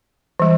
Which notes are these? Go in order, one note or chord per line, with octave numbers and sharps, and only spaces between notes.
E3 G3